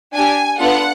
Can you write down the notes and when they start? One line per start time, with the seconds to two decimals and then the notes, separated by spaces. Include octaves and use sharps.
0.14 D4 G4 G#5
0.58 B3 D4 F4 A4 F#5